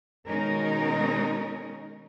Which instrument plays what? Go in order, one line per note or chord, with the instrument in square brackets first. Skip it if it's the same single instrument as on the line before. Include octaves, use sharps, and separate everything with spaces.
[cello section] B2 D#3 G#3 C#4 D#4 A#4